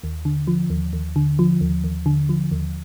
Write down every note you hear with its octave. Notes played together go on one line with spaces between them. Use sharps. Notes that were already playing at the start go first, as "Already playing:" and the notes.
D#2
D3
F3
D#2
D#2
D3
F3
D#2
D#2
D3
F3
D#2